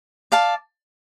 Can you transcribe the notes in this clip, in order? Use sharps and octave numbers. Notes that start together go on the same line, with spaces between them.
D5 F5 A5